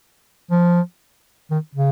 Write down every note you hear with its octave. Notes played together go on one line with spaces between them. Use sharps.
F3
D#3
C#3